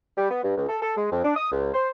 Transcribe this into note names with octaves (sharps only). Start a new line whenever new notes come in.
G3
B3
G2
C#2
A4
A4
G#3
F2
D4
D#6
C#2
C5